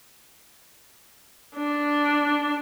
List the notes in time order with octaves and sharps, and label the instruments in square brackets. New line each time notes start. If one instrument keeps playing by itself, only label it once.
[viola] D4